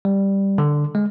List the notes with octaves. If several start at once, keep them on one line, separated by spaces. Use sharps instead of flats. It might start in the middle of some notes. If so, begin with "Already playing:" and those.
G3
D3
G#3